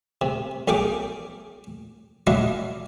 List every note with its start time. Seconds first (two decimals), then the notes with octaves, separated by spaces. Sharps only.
0.21 C3
0.68 B1 C#4 G#4 G5 D6
2.27 F#3 D4 E4 D#5 F5